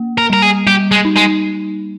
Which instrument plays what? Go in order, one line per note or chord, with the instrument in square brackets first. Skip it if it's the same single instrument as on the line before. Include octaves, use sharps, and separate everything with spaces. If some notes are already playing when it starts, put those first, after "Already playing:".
Already playing: [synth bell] A#3
[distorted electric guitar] A#4
[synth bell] G3 [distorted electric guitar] A#4
[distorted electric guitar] G#4
[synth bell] G3 [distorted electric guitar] G4
[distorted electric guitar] G#3
[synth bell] D#4
[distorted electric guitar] G#3